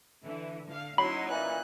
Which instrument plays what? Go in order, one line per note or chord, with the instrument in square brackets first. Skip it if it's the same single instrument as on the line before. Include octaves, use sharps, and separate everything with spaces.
[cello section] D3 E3
D3 F5
[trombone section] F#3 [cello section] A#3 C#4 D#4 [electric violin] E4 C6 [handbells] B5
[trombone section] A#2 E3 [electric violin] F#6